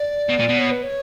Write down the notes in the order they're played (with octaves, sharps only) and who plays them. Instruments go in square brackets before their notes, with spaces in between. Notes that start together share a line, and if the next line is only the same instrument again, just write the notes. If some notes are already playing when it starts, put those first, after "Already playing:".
Already playing: [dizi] D5
[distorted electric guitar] B2
A#2
B2
[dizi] C#5
B4
C#5